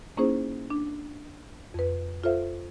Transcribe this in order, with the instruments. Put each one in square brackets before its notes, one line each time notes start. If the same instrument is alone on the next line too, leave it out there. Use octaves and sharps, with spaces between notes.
[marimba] A#3 C#4 D#4 E4 G#4 C5
D4
F2 B4
F4 A4 C5 E5 F5